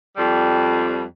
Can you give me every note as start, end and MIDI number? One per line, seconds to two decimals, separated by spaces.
0.17 1.02 41
0.17 1.02 55